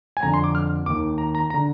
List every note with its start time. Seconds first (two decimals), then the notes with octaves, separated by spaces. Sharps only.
0.17 G#5
0.23 F2 D3 A#5
0.34 C6
0.44 D6
0.55 F6
0.86 D#2 D#3 D6
1.18 A#5
1.35 A#5
1.50 A#5
1.54 D3